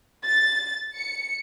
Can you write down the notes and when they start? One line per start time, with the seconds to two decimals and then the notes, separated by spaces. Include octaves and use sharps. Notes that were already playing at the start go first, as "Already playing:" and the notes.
0.25 A6
0.96 C#7